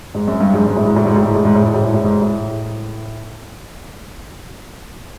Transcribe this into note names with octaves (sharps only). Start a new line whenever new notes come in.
G#2
F#2
G2
G#2
G#2
A2
G#2
A2
G#2
A2
G#2
A2
G#2
A2
G#2
A2
G#2
A2
G#2
A2